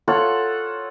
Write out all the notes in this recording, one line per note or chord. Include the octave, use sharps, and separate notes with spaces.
F4 A4 C#5 F#5